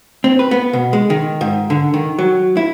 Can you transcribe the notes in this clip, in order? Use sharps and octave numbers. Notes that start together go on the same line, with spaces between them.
C4
B4
B3
B2
G#3
D#3
G#2
D3
D#3
F#3
E4